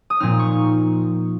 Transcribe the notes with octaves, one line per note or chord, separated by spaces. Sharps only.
D#6
A#2 F3 C4 D#4 F6
C#6